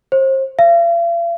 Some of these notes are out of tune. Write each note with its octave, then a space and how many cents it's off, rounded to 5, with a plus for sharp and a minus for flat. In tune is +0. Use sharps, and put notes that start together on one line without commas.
C5 +35
F5 -45